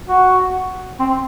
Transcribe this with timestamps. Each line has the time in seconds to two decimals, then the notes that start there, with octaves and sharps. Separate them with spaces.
0.09 F#4
1.00 C4